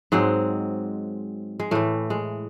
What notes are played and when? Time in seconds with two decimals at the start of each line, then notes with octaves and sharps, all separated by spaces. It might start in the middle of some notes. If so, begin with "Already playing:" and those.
0.12 G#2 F#3 G#3 C4
1.59 G#3
1.71 A2 E3 A3
2.10 G#3